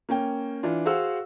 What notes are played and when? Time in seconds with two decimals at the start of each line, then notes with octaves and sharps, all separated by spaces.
0.09 A#3 C#4 G5
0.63 E3 D4 F4
0.86 F#4 G#4 C5 F5 F#5 E6